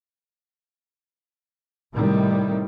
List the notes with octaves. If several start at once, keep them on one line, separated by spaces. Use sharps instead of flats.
A2 C3 D#3 G3